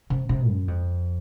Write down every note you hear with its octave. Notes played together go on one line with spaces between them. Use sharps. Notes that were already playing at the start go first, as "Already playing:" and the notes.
C3
C3
F#2
F2